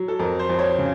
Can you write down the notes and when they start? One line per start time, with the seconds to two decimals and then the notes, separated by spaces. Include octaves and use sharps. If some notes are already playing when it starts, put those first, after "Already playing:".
Already playing: F#3
0.08 A4
0.19 F2 A#4
0.39 C5
0.49 F2
0.59 C#5
0.79 C#3